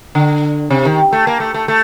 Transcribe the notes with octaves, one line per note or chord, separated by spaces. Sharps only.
D3
C3
D#3
A3
A#3
A3
A3
A3